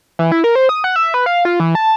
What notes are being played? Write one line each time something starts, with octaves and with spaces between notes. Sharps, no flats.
E3
E4
A#4
C5
D#6
F#5
E5
B4
F5
F4
E3
A5